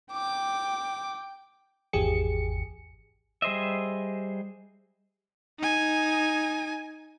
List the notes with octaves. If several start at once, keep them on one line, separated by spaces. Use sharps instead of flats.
G5 D6
G#1 E2 G4 G#4 C#7
G3 G#4 C5 D#5 E5
D#4 G#5